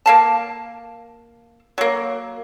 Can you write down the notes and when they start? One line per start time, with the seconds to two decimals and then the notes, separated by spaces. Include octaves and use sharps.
0.06 A#3 F5 A5
1.78 F#3 A#3